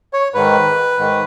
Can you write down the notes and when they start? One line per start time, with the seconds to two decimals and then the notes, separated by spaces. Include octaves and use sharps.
0.13 C#5
0.34 G#2 D#3 B4
0.98 G#2 D#3